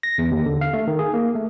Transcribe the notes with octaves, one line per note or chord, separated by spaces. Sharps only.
A#6
E2
D#2
D3
F5
A3
D#3
G#4
A#3
A3